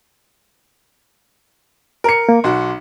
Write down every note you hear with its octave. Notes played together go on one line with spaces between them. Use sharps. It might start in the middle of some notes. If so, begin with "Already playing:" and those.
A#4 C#7
A#3
B1 F#4 C6